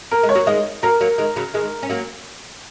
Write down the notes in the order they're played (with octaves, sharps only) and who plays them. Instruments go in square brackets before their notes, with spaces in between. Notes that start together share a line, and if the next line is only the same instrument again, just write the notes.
[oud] A#3 [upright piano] A#4
[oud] G#3
[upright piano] C#5
[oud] F#3 A#3
[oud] D#3 G#3 [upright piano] D#5
[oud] F#3 A#3 [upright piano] A#4
[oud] F#3 A#3
D#3 G#3
C#3 F#3
D#3 G#3
C#4
F#3 A#3